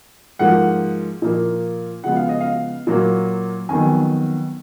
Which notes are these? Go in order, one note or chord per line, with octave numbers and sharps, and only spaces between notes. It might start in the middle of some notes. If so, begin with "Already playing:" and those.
G#2 F3 A#3 F#5
A#2 F3 A#3
C#3 F3 G#3 B3 F#5
F5
D#5
F5
A#2 F#3 A#3
F2 D#3 F#3 B3 G#5